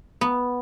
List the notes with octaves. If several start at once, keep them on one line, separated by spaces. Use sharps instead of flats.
B3